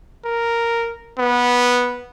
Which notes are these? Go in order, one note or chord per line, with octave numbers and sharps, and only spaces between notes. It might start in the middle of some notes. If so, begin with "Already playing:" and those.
A#4
B3